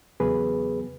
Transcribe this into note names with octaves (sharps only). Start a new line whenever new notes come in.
E2 C#3 F#3 B3 G#4 B4